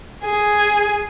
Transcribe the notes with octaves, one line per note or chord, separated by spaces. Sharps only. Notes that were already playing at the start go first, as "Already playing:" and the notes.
G#4